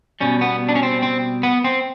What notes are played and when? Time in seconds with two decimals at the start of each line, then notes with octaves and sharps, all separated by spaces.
0.21 B2 G3 C#4
0.41 B3
0.69 D4
0.75 C#4
0.83 C4
1.02 C4
1.43 B3
1.64 C4